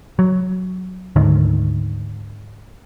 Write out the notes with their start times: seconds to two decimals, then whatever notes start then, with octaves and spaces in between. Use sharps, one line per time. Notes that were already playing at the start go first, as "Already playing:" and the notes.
0.19 F#3
1.16 D2 G#2 D3 D#3